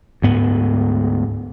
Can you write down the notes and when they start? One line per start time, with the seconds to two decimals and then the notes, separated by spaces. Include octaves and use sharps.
0.22 D2 G#2 B3